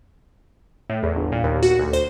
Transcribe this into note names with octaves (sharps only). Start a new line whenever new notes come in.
A2
E2
G1
A#2
D#2
F#4
D2
C5